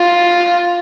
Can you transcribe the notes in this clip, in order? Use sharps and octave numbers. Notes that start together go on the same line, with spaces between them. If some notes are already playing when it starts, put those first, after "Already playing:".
Already playing: F4